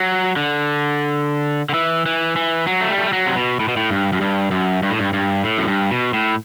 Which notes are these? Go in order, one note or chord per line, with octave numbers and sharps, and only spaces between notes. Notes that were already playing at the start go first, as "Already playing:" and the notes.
Already playing: F#3
D3
D3
E3
E3
E3
F#3
A3
G3
A3
G3
F#3
C3
B2
A2
B2
A2
G2
F#2
G2
F#2
G2
A2
G2
G2
A2
F#2
G2
B2
A2